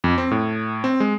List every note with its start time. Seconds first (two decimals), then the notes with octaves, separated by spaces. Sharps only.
0.04 F2
0.18 C4
0.31 A2
0.84 C4
1.00 G#3